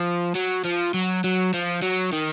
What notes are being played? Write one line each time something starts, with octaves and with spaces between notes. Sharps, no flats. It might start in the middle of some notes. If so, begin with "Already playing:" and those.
Already playing: F3
F#3
F3
F#3
F#3
F3
F#3
D#3